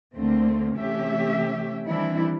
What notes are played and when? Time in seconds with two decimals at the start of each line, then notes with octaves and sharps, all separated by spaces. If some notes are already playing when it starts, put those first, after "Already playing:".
0.14 D2 D3 A3 A#3 C4
0.76 C3 E3 A3 C#4 G4 E5
1.87 D#3 E3 G3 C4 D4 E4